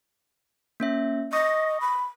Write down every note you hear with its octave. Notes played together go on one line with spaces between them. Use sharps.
A#3 C#4 E5
D#5 C#6 D#6 A#6
B5